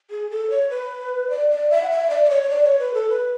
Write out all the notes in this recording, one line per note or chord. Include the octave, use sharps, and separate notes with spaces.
G#4
A4
C#5
B4
D5
D5
E5
F#5
E5
D5
D5
C#5
C#5
D5
C#5
B4
A4
B4